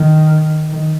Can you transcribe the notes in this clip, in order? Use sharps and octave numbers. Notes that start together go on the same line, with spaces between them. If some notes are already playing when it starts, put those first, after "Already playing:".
Already playing: D#3
D#3